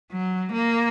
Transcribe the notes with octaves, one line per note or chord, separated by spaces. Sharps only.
F#3
A#3